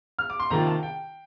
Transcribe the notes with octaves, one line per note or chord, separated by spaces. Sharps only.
F6
D6
C6
C3 D#3 A#3 F4 A#5
A5
G5